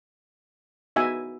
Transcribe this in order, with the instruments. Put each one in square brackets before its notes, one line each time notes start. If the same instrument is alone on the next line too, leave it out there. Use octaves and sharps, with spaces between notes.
[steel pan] B3 D#4 F#4 E5 G#5